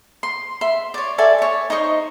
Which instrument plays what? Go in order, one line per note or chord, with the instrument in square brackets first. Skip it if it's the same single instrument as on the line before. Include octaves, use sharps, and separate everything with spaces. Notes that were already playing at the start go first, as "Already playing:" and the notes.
[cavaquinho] C6
E5 C6
C#5 D5
A4 D5 E5 G#5
C#5 E5
D#4 C5 D#5 C#6